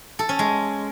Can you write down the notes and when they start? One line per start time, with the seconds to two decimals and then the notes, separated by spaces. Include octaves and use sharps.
0.19 A4
0.29 C#4
0.39 G#3